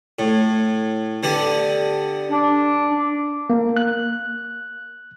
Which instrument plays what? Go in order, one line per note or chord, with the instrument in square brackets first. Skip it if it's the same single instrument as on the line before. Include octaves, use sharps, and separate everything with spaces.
[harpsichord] A2
D3 B3 G4
[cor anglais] D4
[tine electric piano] A#3
F#6